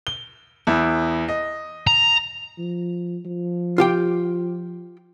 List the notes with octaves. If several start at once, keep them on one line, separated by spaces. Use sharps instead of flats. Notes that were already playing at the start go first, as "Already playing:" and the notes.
G7
E2 E4
D#5
A#5
F3
F3
F4 G4 G5